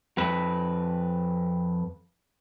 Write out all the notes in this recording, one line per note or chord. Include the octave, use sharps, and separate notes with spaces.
F2 B4